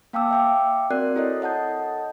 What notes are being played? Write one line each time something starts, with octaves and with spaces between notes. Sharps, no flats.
A#3 F5 G5 A5 D6 E6
E5 G5 D6
C4 F#4 A#4 D5 F#6 C7
E4 A4 C#5 D#5
A4 D#5 F#5 A5 G6